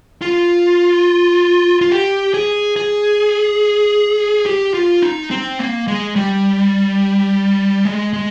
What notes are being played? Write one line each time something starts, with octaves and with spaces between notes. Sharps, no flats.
F4
F4
G4
G#4
G#4
G4
F4
D#4
C4
A#3
G#3
G3
G#3
G#3